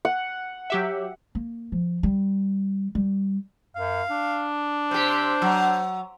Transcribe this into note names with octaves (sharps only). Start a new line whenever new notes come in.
F#5
F#3 G4 E5
A#3
F3
G3
G3
F#2 F5
D4
C3 G4 C5
F#3